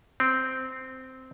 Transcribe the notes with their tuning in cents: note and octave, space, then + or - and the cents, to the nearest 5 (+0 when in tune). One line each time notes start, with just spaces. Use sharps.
C4 -10